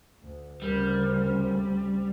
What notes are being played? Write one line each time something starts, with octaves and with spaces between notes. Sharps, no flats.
D2
D2 C#3 G3 C4 A#4